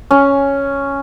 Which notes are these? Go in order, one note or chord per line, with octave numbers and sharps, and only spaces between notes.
C#4